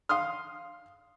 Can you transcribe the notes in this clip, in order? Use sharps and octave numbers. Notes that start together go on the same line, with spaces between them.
F5 C6 D#6 F6